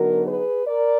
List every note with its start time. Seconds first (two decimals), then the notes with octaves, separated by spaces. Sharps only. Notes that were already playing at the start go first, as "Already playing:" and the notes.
Already playing: D3 F#3 B3 D#4 F#4 A#4
0.25 G#4 B4
0.66 A#4 D5